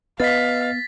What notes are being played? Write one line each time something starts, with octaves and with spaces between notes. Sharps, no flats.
B3 B4 D#5 F5 A6 B6